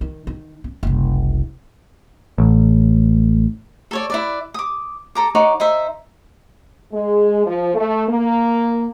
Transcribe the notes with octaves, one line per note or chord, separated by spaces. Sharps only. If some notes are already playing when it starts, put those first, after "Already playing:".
D#3
D#3
C#4
F#1 C2
A1
A4 C#5 D5
E4 B4 D5
D6 D#6
A4 A#5 D6
D#4 C#5 F#5 D6
D#4 C5 E5
G#3
F3
A3
A#3